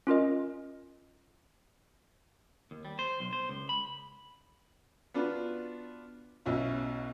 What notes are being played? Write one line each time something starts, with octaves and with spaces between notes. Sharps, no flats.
C#4 F4 A#4 D#5
D#2
G3
C5
B1
C5
C#2
B5
B3 D4 F4 F#4 B4
B1 B2 C#4 E4